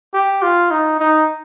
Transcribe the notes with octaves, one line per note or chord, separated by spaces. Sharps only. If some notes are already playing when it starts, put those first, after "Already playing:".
G4
F4
D#4
D#4